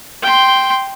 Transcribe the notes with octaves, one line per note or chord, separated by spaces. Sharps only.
G5 C6